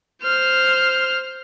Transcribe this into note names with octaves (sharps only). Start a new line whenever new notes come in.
C5 F6